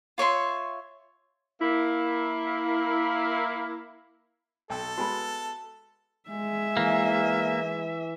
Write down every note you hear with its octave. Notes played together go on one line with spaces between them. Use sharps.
F4 C#5 E5 C6
A#3 E4
B1 A4 G5 E6
G#3 B3 F#4 G#5 B5
G#3 G#4 E5
E3 A#3